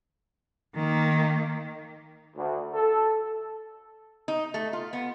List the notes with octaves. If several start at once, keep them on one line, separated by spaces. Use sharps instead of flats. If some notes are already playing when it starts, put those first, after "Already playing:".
D#3 A#3
D2
A4
D#4
A3
F4
B3